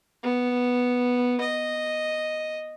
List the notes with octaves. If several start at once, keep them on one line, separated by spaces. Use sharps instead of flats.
B3
D#5